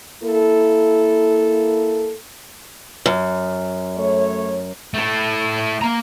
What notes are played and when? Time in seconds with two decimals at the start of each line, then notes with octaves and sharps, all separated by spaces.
0.23 A#3 E4 A4
3.06 F#2
3.97 A3 C#5
4.94 A3 E4
5.82 A#3 A#5